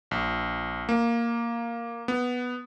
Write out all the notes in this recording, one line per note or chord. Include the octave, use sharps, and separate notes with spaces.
A#1
A#3
B3